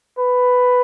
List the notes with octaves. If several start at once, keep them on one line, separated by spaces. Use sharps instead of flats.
B4